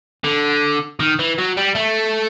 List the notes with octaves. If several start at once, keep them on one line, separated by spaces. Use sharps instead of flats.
D3
D#3
E3
F#3
G3
A3